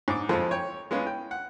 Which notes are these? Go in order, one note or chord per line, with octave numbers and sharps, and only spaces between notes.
G#2 D6
F2 F3 G#3 A4
C#5 G5
G#3 B3 C#4 F4
G5
F#5